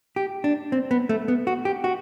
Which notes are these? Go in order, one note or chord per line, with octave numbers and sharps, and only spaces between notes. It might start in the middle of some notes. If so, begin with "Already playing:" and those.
G4
D4
C4
B3
A3
B3
F#4
G4
F#4